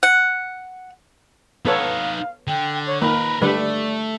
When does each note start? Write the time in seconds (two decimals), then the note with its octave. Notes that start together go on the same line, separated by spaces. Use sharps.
0.03 F#5
1.65 B3 D#4 A4 B4 C#5 F5
2.48 D3 G5
2.86 C#5
3.02 D#3 A#3 A#4 B4 B5
3.42 D3 G3 A3 B4 D5